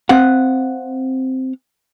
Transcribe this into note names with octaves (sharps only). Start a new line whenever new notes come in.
C4 F5 F#5